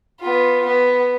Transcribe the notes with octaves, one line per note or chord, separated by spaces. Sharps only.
B3 F4
B3